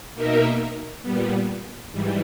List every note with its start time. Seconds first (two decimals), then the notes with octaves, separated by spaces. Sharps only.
0.15 B2 A#3 D#4 A#4 E5
1.02 A#2 G3 B3
1.91 G#2 E3 G3